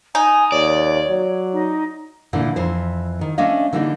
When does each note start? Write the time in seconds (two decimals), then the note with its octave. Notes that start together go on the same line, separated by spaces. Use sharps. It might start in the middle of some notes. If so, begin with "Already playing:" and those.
0.15 D#4 G#5
0.52 D#2 C#5 D5
1.09 F#3
1.53 D#4
2.33 A#2 D3 E3 A3
2.56 F2 E3 C5
3.21 D#3
3.38 A3 C#4 D4 C#5 D#5 F5
3.73 D3 E3 G3 A#3 C4 D#4